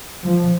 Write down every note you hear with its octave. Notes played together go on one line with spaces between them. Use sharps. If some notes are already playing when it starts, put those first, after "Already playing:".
F3